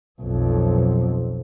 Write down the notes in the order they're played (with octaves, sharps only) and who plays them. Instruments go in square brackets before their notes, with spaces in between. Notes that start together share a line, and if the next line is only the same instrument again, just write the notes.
[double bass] B1 F2